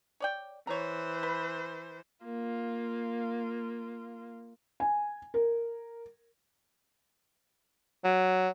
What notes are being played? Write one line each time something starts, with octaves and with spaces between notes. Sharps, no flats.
C#5 D5 G5
E3 C5 C#5 A#5
B4
A#3 F4
G#5
A#4
F#3